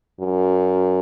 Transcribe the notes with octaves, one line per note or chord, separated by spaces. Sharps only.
F#2